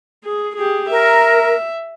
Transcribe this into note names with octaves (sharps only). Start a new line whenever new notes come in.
G#4
G4 G#4
A#4 E5